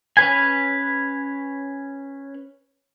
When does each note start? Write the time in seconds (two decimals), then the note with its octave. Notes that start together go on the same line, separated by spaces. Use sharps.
0.17 C#4 B4 G#5